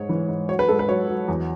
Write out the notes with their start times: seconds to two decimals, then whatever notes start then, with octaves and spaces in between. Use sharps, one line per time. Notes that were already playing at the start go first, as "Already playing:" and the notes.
Already playing: G#2 G#3 C#5
0.09 E3
0.29 G#2
0.49 F#3 C#5
0.59 B4
0.68 G#2 A4
0.79 B4
0.89 F#3 C#5
1.08 F#3
1.28 E2